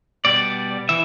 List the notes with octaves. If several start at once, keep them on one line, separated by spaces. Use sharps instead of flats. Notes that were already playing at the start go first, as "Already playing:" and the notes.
B2 G3 B3 D5
E3 E5